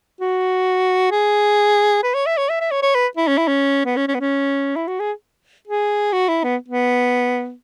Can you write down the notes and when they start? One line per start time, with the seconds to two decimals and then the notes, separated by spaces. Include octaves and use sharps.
0.21 F#4
1.11 G#4
2.03 B4
2.14 C#5
2.26 E5
2.38 C#5
2.49 E5
2.61 E5
2.71 C#5
2.83 C#5
2.95 B4
3.17 E4
3.28 C#4
3.38 E4
3.48 C#4
3.85 B3
3.97 C#4
4.08 C#4
4.15 B3
4.20 C#4
4.76 E4
4.88 F#4
5.00 G#4
5.68 G#4
6.13 F#4
6.28 E4
6.44 B3
6.68 B3